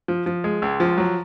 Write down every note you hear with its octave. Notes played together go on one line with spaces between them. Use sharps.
F3
F3
G#3
C#2
F3
F#3